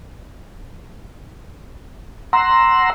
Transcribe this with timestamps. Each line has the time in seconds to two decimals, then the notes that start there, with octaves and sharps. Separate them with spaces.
2.33 F#5 A#5 C6 E6